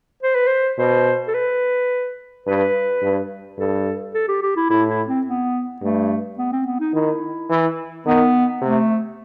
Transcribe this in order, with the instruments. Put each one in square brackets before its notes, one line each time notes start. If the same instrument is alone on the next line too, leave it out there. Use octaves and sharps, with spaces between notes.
[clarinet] C5
B4
C5
[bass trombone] B2 [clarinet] C5
[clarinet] A4
B4
[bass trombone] G2 [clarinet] B4
[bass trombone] G2
[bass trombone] G2 [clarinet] A4
[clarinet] A4
G4
G4
E4
[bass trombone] A2 [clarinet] E4
[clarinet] E4
C4
B3
[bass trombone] G2 [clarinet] A3
[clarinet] B3
C4
B3
D#4
[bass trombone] D#3 [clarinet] E4
[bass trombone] E3
[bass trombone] D#3 [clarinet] B3
[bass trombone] C3 [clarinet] A3